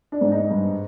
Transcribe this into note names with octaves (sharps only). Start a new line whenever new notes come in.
D4
G#2
D#4
G2